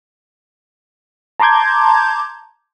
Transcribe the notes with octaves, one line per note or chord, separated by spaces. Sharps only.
A5 A#5 C6 D6 G6 G#6